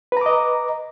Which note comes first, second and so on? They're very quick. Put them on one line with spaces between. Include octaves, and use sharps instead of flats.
B4 A#5 D6 D#5